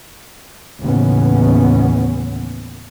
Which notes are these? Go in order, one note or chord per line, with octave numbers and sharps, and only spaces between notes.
D#2 A2 C#3 E3 B3 C#4